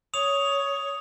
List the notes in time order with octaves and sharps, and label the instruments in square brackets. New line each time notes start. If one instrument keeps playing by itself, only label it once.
[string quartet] C#5 [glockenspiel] D#6 F7